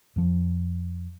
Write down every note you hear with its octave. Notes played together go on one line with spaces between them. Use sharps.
F2 F3